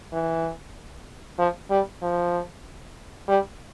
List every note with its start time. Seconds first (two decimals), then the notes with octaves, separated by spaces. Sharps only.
0.13 E3
1.39 F3
1.71 G3
2.02 F3
3.28 G3